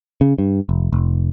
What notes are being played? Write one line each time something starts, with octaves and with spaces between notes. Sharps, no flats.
C#3
G2
F1
F1